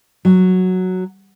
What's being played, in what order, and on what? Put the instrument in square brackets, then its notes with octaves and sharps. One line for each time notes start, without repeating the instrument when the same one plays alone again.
[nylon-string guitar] F#3